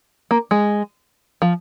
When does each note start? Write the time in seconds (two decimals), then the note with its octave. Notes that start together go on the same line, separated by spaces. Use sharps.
0.31 A#3
0.51 G#3
1.42 F3